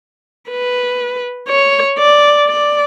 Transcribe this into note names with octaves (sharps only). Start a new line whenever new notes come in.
B4
C#5
D5
D5